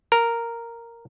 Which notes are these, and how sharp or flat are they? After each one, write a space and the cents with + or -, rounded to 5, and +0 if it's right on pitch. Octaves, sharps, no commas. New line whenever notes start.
A#4 -5